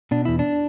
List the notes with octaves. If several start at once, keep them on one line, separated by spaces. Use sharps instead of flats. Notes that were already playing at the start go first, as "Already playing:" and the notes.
B2 D4
E2 E4
D4